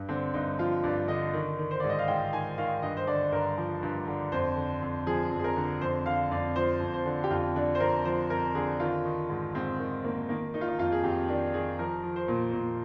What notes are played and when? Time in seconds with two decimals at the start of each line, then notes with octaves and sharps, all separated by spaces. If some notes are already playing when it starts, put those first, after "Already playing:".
Already playing: G2
0.08 D3 C4
0.34 G2 D#4
0.59 F3 F4
0.83 G2 D5
1.08 D3 D#5
1.33 D#3
1.58 D#3
1.71 C5
1.80 G#2 D5
1.89 D#5
1.99 F5
2.08 G#2 G5
2.33 D#3 G#5
2.58 D#3 F5
2.82 G2 D#5
2.97 C5
3.07 D3 D5
3.32 G2 A#4
3.57 F3
3.83 G2
4.07 D3
4.32 F2 C5
4.56 D3
4.82 F2
5.06 F3 G#4
5.31 F2
5.39 G#4
5.44 A#4
5.56 D3
5.81 F2 C5
6.06 D3 F5
6.31 F2 D5
6.56 F3 C5
6.80 F2
6.93 C5
7.06 D3
7.24 G4
7.30 F2 F4
7.55 D3 D4
7.75 C5
7.80 F2 A#4
8.05 F3 C5
8.30 F2 A#4
8.55 D3 G#4
8.80 D#3 F4
9.05 D#3
9.29 G#2
9.55 G#2 C4
9.79 D#3
10.04 D#3 A#3
10.29 D#3 A#3
10.54 D#3 D#4
10.61 F4
10.68 D#4
10.78 F2 F4
10.92 G#4
11.03 F2 G4
11.28 D#3 D4
11.54 D#3 G#4
11.79 F3 A#4
12.03 F3
12.16 C5
12.28 A#2
12.53 A#2